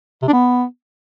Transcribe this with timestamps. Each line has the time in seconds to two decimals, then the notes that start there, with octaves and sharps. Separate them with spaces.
0.22 C3
0.28 D4
0.33 B3